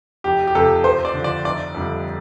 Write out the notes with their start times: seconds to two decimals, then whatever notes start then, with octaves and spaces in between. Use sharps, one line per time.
0.24 F1 G4
0.47 G4
0.55 F2 C3 A4
0.84 F2 C5
1.05 D5
1.14 D3
1.20 F3 D5
1.45 F1 D5
1.75 F2 D3 G3